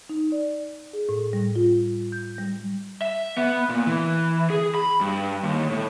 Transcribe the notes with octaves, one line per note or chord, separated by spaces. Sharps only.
D#4
D5
G#4
A2
G3
F4
G6
G3
E5
B3
A#2
E3
G#4
B5
G2
D#2
A2